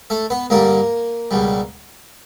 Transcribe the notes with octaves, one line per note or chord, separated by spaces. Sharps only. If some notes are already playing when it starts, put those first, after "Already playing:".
A3 A4
B3 B4
G2 D3 G3 A#3 A#4
C#2 B2 G3